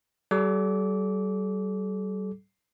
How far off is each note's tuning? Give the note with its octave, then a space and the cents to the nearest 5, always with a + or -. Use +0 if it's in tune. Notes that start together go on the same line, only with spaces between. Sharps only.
G3 -40 A4 -40 D6 -20